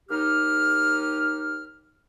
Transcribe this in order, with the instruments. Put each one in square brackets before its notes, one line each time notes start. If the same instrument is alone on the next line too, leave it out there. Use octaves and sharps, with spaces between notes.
[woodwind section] D#2 D#4 G4 F6